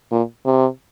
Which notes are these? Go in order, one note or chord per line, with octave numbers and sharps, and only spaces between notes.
A#2
C3